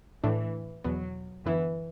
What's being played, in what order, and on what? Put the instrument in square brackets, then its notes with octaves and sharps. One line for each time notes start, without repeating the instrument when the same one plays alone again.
[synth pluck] A2 A3 D4 [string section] E3
[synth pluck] E2 B2 B3 [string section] F#3
[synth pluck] F#2 D3 B3 E4 [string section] E3